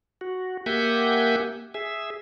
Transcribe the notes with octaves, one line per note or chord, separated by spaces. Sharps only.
F#4
A#3 G4 E5 F#5 G#5 G6
G#4 E5